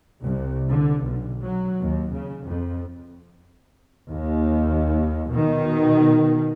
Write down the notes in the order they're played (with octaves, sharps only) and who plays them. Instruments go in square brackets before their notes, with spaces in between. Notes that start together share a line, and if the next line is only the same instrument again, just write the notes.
[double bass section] C2
D3
B1
F#3
D#2
C#3
F2
D#2
B2 D#3